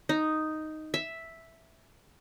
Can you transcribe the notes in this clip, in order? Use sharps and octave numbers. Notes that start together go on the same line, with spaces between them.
D#4
E5